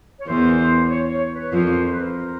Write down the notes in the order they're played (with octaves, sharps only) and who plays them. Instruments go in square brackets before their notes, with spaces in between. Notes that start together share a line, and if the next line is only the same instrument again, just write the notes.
[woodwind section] C#5
[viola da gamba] E2 E3 [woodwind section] A#4 C5
[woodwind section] C#5
C#5
B4 C#5
[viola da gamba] F2 F3 [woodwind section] A#4 C5
[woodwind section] C5
B4
A#4 C5